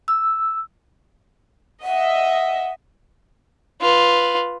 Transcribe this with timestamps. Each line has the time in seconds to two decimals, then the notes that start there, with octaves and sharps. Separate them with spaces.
0.08 E6
1.83 D#5 E5 F#5
3.82 F4 B4